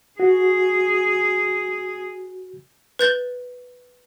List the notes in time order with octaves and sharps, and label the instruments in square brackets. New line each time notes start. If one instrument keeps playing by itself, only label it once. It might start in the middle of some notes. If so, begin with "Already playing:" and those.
[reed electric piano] F#4 [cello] G#4
[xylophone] B4 G6 A6 G7